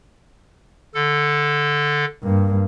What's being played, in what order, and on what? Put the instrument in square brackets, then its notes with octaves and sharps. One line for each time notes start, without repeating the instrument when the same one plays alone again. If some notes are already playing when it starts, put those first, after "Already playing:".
[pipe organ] D3 A4
[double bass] G2 A#3